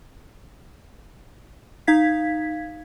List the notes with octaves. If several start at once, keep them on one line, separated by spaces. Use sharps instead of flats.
D#4 F5 G#6 B6